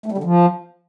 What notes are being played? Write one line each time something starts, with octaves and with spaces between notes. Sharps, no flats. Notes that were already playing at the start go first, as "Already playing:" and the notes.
A3
G3
D3
F3